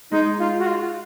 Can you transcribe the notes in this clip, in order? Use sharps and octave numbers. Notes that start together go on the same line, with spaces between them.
G#3 D#4
F4
F#4
F4